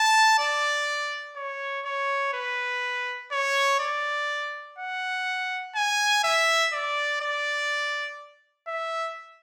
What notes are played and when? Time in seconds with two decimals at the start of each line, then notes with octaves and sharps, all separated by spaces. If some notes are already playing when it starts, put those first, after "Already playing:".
Already playing: A5
0.39 D5
1.36 C#5
1.85 C#5
2.33 B4
3.32 C#5
3.80 D5
4.79 F#5
5.75 G#5
6.24 E5
6.73 D5
7.22 D5
8.68 E5